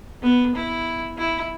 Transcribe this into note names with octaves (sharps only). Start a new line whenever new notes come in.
B3
E4
E4